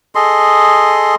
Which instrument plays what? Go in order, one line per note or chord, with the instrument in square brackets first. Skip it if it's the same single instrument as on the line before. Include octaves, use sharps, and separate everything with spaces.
[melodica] G#4 A4 D#5 C6